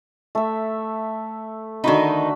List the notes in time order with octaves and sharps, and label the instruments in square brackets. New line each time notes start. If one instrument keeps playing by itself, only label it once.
[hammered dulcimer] A3 E5
[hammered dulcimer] D3 F#4 B5 [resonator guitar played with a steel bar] D#3 D#4